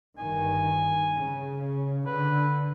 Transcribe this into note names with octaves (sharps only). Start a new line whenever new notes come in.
G1 G2 D#3 G#5
C#3
D3 B4